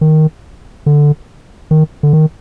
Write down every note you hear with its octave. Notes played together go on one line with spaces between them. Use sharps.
D#3
D3
D#3
D3
D#3